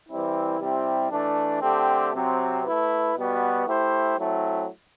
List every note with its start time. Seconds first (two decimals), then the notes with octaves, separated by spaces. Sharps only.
0.09 E3 G3 C4 E4
0.60 C3 G3 C4 E4
1.11 E3 A3 D4
1.62 D3 A3 C4 G4
2.13 C3 F#3 C4
2.64 A3 E4 B4
3.16 B2 G3 B3 F#4
3.66 A3 E4 G4 C5
4.18 F#3 A3 C4 E4